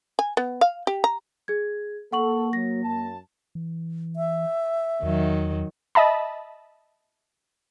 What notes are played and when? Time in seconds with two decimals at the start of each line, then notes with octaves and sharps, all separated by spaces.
0.19 G#5
0.37 B3
0.61 F5
0.87 G4
1.04 A#5
1.48 G#4 G#6
2.13 A#3 A4 F#5 C#6 F#7
2.53 F#3 A#6
2.84 F#2 A5
3.55 E3
4.16 E5
5.03 E2 D#3 F#3
5.95 D#5 E5 A5 B5